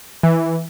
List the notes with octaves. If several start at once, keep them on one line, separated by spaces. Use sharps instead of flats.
E3